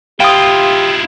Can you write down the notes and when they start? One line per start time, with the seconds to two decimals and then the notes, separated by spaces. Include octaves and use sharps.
0.20 E4 F4 G4 F5 G5 D#6